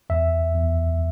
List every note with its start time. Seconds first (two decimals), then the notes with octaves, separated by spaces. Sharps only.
0.10 E2 E5
0.54 E2